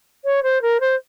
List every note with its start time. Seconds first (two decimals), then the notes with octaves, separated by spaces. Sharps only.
0.24 C#5
0.43 C5
0.61 A#4
0.80 C5